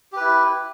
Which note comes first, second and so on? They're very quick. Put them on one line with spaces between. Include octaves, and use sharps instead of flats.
G4 B4 E4